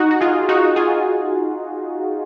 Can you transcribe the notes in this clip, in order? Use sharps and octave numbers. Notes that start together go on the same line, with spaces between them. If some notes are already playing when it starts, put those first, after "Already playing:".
Already playing: D#4 F#4
F#4
F4 G#4
D#4 F#4
F4 G#4